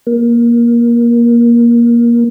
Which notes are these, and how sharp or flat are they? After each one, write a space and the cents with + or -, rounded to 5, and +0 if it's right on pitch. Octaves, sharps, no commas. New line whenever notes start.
A#3 +20